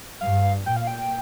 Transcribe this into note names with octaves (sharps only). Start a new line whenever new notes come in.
G2 F5
A#2 G5
F5
G5